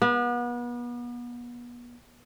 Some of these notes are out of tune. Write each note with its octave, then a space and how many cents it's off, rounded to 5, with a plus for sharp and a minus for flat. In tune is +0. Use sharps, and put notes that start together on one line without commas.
B3 -35